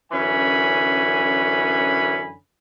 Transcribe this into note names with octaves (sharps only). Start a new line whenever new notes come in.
F#2 D3 E3 C#4 G#5 B5